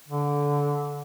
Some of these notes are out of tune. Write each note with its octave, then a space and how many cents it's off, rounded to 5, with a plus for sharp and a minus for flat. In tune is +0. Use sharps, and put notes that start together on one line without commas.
D3 -20